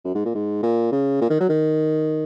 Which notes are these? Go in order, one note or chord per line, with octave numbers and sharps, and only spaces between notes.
F#2
G#2
A#2
G#2
A#2
C#3
A#2
D#3
F#3
D#3